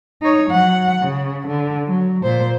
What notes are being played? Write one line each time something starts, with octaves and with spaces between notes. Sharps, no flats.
D#4 C#5
F#3 F#5
C#3
D3
F#3
A#2 C5